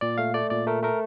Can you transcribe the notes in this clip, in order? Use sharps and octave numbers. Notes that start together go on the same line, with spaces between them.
A#2 D5
A3 F5
A3 D5
A#2 D5
A3 A#4
A3 A#4